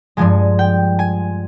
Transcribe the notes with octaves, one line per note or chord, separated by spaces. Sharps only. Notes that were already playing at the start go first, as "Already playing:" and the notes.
G2 F3 G#3 G#5
G5
G#5